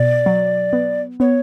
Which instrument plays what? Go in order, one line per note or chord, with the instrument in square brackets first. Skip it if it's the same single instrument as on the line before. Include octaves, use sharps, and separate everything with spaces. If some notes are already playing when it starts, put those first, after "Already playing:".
Already playing: [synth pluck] B2 [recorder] D5
[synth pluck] F#3
B3
[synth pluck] B3 [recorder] C#5